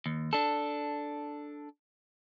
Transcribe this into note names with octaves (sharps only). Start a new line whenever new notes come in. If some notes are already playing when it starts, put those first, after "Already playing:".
D#2
D4 A4